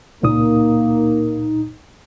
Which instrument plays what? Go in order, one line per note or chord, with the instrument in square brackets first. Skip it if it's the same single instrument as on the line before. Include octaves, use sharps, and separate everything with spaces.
[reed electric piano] C#2 A#2 D#6 [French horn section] A#3 [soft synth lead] D#4